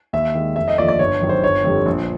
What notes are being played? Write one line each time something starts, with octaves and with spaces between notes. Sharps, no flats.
D#2 E5
D#3 G#3
F1 E5
D#5
D#2 D3 F3 D5
D5
G1 C#5
F#2 D#3
C5
G1 C#5
F2 D3 G3
A#1